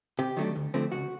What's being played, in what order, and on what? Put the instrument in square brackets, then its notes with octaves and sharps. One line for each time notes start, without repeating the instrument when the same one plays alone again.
[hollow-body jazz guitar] C3 G4
D#3 F#3 A3 D4
D2
D3 F3 A3 C4
C#2 F#4